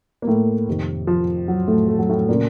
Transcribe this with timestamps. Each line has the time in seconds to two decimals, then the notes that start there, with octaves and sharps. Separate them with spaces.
0.22 A#3
0.27 A2 A3
0.68 F2 C3 D#3
1.07 F3
1.48 F#3
1.68 A2 A3
1.88 A3
1.99 F#3
2.09 A2 A3
2.29 A#2 C#3 A#3